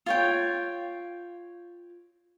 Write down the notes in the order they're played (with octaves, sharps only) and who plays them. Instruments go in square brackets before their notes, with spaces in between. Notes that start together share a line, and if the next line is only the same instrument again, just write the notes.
[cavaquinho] F4 C#5 G5